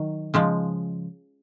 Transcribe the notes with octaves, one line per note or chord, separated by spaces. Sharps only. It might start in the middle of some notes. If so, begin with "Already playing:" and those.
Already playing: D#3 F#3
C#3 F3 G#3